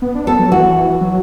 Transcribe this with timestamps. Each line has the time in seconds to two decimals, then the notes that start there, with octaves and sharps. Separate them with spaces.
0.02 B3
0.15 D4
0.27 B3 A4
0.39 F#3
0.51 E3 F#4
1.01 F#3